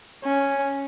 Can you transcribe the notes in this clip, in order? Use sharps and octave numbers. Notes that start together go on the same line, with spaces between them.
C#4